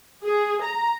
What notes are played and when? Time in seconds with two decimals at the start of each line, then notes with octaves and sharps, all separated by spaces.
0.24 G#4
0.62 A#5